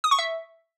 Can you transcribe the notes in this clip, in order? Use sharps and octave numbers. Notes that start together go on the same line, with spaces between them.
D#6
C#6
E5